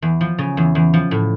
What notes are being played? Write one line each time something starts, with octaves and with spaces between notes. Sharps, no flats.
E2
F3
C#3
E2
E2
F3
A2